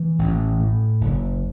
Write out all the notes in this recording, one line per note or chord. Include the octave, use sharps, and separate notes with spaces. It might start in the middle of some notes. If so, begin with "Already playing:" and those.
Already playing: E3
A1
A2
F#1